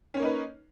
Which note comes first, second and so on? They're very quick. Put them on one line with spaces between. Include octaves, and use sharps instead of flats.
C#4 C#5 A#3 D#4 B4